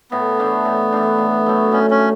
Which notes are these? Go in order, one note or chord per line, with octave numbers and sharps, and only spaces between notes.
A2 B3
E3 A3 D4
A2
E3 A3 D4
A2
F#3 A3
A2 C#4
C#4
A3